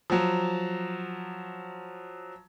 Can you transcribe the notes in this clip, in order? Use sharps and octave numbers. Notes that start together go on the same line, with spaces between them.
F3 F#3